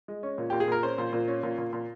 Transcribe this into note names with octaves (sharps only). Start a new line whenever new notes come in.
G#3
C#4
A#2
A#2 G4
G#4
A#2 A#4
C#4 C5
A#2
A#2
C#4
A#2
A#2
A#2